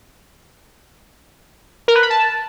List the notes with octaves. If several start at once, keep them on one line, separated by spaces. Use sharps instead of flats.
A#4
B4
B5
A5